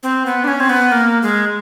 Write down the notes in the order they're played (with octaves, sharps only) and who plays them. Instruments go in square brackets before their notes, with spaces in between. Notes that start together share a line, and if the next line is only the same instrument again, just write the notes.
[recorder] C4
B3
D4
C#4
C4
B3
A#3
G#3